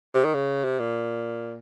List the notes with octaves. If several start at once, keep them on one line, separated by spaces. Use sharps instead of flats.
C3
D#3
C#3
C3
A#2